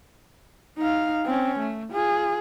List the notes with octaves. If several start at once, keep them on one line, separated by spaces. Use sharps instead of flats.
D#4 F5
C4 C#4
A3
F4 G#4